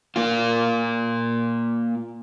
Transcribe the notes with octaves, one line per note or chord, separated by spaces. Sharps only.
A#3 F4